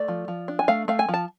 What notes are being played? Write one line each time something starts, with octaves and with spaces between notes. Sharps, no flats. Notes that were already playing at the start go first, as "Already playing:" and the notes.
Already playing: A3 D5
F3
F3
D4
G#5
A3 F5
A3 F5
G#5
F3
A5